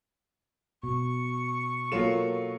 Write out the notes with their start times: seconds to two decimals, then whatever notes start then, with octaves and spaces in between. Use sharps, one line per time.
0.84 B2 C#6
1.92 F#3 A#3 F4 A4 E7